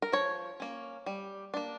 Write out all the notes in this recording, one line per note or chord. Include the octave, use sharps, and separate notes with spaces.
A#4
F3 C#5
A#3 C#4
G3
A#3 D4